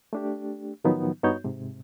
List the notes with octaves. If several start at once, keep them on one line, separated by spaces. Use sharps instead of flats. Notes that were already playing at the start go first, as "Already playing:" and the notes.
A3 D4 G4
A2 D#3 F3 F#3 B3 D#4
G2 B3 D#4 F#4 C#5 G6
G#2 C3